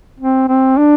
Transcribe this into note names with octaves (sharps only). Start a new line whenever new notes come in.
C4
C4
D4